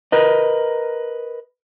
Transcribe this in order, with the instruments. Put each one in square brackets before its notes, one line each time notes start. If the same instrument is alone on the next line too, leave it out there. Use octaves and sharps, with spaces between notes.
[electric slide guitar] A#4 B4 D#5